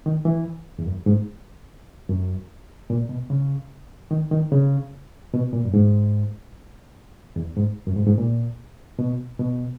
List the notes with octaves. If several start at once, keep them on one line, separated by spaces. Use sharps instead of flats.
D#3
E3
E2
F#2
G#2
F#2
A#2
B2
C#3
D#3
D#3
C#3
B2
A#2
F#2
G#2
E2
G#2
F#2
G#2
G#2
A#2
B2
B2